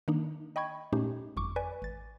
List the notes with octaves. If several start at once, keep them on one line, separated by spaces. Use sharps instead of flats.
D#3 A#3 D4 D#4
D#5 G5 B5 C#6 G#6
A#2 A3 C#4 D#4 G4
G1 F2 C#6 D6
B4 D5 G#5
G#1 A6